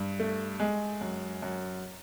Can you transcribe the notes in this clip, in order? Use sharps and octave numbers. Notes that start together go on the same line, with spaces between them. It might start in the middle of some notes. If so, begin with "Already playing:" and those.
Already playing: G2
A3
G#3
F#2
F#2